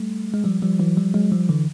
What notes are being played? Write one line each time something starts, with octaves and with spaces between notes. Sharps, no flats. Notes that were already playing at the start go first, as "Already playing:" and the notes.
Already playing: G3 A3
G#3
F3 G3
F3 G3
E3 F#3
F3 G3
F#3 G#3
F3 G3
D3 E3